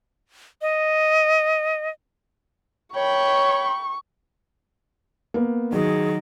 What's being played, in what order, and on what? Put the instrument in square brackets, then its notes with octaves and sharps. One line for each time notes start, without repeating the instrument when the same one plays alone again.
[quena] D#5
[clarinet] C#5 [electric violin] G5 B5 [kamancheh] C#6
[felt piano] A#3 B3
[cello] D#3 [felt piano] F#3 [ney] G#4